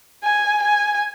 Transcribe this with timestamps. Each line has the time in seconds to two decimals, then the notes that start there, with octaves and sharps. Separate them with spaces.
0.24 G#5
0.62 G#5